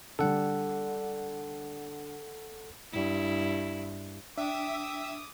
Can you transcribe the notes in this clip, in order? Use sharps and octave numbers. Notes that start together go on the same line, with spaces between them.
D3 G3 A4 F#5
G2 E4
D4 E5 G5 D6 D#6